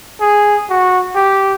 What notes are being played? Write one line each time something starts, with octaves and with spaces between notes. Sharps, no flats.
G#4
F#4
G4